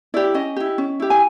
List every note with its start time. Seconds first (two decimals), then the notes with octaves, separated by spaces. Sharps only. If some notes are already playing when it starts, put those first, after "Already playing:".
0.14 E4 G4 D5
0.34 C#4 D#5
0.56 E4 G4
0.78 C#4
1.00 E4 G4
1.10 G#5